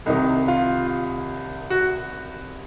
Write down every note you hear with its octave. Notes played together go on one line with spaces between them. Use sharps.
C2 C3 D#3 D#4
F4
F#4